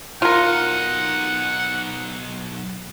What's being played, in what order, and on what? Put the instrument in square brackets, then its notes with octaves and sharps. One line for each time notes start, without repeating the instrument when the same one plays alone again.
[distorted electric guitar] B1 D#4 [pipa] F4 A#4 [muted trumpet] F#5